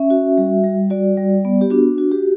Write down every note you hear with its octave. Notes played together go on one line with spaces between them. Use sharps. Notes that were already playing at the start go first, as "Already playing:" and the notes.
Already playing: C#4 E5
F#4
G3
G3
F#4 D5
G3
B3
G4
D4 F#4
F#4
G4